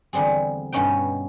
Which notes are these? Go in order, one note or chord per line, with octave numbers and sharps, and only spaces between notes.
E2 D3 G3 C4 G#4
G2 B2 B3 C#4 D#4 G5